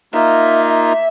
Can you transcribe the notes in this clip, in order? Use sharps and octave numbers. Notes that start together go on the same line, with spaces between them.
A#3 D#4 F4 E5